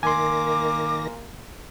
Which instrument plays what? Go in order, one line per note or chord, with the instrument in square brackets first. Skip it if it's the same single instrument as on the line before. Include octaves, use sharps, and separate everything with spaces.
[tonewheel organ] D#3 A#6 [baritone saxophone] A#3 [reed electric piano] G#5 C6 [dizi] D6